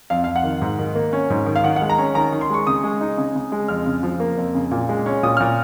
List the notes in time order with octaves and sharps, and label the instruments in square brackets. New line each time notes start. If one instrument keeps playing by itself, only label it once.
[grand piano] F2 F5
F2 F5
F#5
D#3
G#2
D#3
A#3
C#4
G#2
D#3
F5
D#3 F#5
F#5
G#3
A#5
C#4
D#3 A#5
D#3
C6
G#3 C#6
C#3 D#6
G#3
D#4
C#3
C#3
G#3
F2 F6
C#3
F3
A#3
F2
C#3
A#2
G#3
C#4
A#2 D#6
A#2 F6